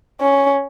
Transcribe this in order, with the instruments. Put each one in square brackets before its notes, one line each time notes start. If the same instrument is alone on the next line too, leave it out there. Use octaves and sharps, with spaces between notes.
[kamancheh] C#4